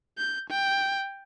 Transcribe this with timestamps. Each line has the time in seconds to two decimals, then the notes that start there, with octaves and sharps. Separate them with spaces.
0.18 G6
0.50 G5